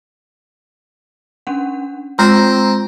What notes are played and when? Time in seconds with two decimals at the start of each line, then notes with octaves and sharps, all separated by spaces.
1.47 C#4 D4 F#5
2.19 G#3 C4 F4 A#5 E6